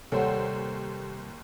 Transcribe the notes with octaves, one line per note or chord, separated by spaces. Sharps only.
D#2 C3 G3 A4 C5 C#5 F#5